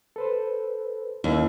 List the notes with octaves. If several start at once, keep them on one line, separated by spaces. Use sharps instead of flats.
A4 B4 C5
D#2 C#4 E4